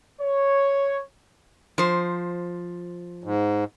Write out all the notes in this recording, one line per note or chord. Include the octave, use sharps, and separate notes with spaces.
C#5
F3 C5
G#2